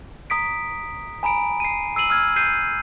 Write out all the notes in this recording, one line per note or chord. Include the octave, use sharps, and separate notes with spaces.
A#5 D#6 B6 D7
G#5 A#5 B5 D7
C7 D#7
E6 C7 D#7 F#7
E6 F6 G#6
G6 C7 D#7